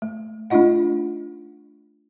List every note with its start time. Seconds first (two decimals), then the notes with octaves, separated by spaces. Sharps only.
0.02 A3
0.50 A3 D4 D#4 F4 D#5 F#5